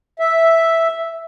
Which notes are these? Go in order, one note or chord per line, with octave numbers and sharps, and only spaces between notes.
E5